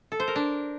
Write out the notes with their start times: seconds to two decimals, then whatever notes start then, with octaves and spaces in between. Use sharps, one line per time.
0.12 A4
0.20 C5
0.28 A#4
0.36 D4